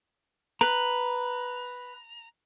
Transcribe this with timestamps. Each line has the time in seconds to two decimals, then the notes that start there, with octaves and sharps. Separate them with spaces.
0.61 B4 A#5